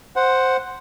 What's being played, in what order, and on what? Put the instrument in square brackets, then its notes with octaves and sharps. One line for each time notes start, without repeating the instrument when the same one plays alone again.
[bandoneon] C5 F#5